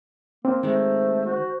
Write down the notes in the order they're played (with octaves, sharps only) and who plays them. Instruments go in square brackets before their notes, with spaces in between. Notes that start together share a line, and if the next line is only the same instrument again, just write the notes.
[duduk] A#3 [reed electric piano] C4
[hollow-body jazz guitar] D#3 G#3 [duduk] A3 [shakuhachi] C5
[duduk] F#4